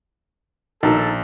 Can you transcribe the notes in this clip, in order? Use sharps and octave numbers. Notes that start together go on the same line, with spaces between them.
A#1 B2 D#3 D#4 A4 A#5 A6